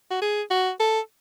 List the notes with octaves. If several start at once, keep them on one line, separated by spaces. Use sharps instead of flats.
F#4
G#4
F#4
A4